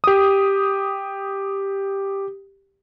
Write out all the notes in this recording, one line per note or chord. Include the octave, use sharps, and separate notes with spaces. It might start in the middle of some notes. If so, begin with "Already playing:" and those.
G4 D#6